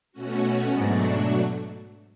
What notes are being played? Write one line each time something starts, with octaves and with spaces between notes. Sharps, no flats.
B2 A3 C#4 F#4
G#2 B2 F#3 A3 D4 F#4